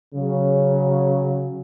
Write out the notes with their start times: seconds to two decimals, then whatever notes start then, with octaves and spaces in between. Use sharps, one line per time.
0.15 C#3 F#3